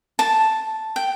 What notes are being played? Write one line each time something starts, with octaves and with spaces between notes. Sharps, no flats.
A5
G5